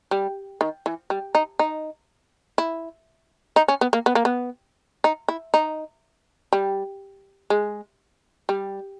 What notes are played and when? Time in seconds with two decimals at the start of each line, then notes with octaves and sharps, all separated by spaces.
0.11 G3
0.61 D#3
0.86 E3
1.10 G3
1.35 D#4
1.59 D#4
2.58 E4
3.56 D#4
3.68 C#4
3.81 B3
3.93 A#3
4.06 B3
4.15 A#3
4.25 B3
5.04 D#4
5.28 E4
5.54 D#4
6.53 G3
7.50 G#3
8.49 G3